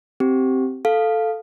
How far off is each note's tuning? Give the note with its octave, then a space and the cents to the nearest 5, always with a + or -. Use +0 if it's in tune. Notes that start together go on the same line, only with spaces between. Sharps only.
C4 +0 G4 -15
A4 +0 F5 +0